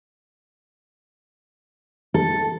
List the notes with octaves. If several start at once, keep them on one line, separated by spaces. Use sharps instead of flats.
A4